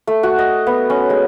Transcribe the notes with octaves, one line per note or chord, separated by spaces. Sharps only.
A3
F#4
D#5
B3
C#4
G#3